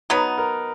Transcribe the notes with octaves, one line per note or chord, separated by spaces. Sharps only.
F#3 B3 D#4 B4
A#4